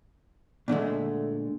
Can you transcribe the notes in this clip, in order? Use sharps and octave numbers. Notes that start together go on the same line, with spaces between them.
A#2 D3 G#3 A3